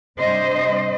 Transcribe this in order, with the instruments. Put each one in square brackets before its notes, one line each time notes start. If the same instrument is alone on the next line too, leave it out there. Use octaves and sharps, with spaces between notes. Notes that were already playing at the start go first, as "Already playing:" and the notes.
[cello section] C3 G3 D4 C5 D#5